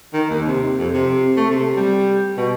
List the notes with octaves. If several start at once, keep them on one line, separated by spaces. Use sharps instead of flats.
D#3
D#2
C3
F2
C3
A3
C3
G3
B2